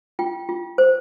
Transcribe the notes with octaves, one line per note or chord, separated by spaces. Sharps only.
F4 G5
F4
C5